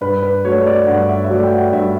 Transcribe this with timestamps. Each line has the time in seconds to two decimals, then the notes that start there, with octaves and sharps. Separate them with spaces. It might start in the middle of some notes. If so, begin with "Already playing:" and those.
0.01 G2 B4
0.22 B4
0.45 F#3 A3 D4 C#5
0.66 D5
0.87 G2 F#5
1.09 E5
1.24 E5
1.29 F#3 A3 D4 D5
1.44 G5
1.52 F#5
1.72 G2 E5